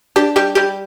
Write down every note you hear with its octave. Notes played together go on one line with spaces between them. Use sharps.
D4 G4
G3 G4
G3 G4